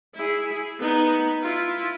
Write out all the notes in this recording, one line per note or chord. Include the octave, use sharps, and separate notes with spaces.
E4 G#4
B3 D#4
E4 F4